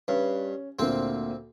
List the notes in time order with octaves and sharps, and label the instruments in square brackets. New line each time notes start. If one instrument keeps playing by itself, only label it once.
[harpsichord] G2 [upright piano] C#4
[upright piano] D2 A#2 A#3 [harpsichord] C4